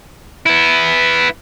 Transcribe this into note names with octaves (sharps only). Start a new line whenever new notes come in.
B3 E4